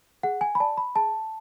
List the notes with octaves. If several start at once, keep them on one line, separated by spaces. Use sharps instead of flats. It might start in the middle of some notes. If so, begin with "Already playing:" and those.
G#4 F#5
G#5
B5
D5 A5
B5
G#4 A5